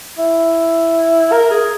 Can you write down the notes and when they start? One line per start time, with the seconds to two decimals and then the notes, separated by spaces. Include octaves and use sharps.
0.18 E4
1.32 A#4
1.51 G#4